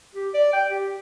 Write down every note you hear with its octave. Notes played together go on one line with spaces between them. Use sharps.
G4
D5
G5
G4